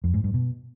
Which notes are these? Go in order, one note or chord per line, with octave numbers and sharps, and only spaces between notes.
F2
G#2
G2
B2